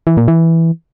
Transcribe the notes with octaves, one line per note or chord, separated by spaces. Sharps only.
E3
A#2
E3